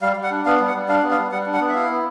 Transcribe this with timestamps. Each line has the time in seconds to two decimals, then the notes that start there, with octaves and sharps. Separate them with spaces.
0.02 G3 F5
0.16 G3
0.23 F#5
0.31 D4
0.45 B3 F5
0.60 G3
0.67 F#5
0.74 G3
0.88 D4 F5
1.03 B3
1.10 F5
1.17 G3
1.32 G3 F#5
1.46 D4
1.54 F#5
1.61 B3
1.69 E5
1.75 E4 F5
1.90 B3